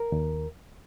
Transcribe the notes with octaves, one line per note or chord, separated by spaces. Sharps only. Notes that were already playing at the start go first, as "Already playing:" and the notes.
Already playing: A#4
D#2